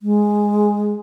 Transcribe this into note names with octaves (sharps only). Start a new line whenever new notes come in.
G#3